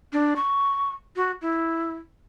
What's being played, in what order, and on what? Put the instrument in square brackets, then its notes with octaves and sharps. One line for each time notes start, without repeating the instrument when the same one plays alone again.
[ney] D4
C#6
F#4
E4